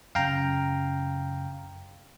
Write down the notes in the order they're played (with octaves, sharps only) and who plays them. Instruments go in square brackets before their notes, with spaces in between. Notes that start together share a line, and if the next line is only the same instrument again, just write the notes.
[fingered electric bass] F#2 C#3 [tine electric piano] F5 G5 A#5